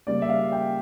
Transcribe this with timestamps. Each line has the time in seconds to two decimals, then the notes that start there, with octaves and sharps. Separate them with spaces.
0.07 C#3 G3 A#3 D5
0.22 E5
0.29 F5
0.52 G5